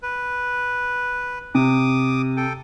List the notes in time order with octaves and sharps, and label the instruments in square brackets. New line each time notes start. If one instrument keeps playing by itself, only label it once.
[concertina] B4
[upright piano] C3 [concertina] D6 D#6
[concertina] A4 G5